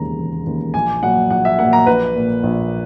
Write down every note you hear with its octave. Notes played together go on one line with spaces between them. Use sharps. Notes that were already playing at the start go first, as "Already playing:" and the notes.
Already playing: E1 D#2 C#3 A#5
E1
D#2 C#3
A#1 G#5
A#2 F#3 A#3 F#5
A#1 F#5
E5
A#2 F#3 A#3 F#5
A#5
A#1 B4
A#2 A#3
A#1